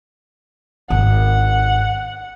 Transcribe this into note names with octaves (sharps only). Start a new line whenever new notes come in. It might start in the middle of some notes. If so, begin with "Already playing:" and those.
G#1 F#5